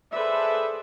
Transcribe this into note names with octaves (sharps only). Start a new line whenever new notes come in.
G#4 A4 B4 C5 D5 E5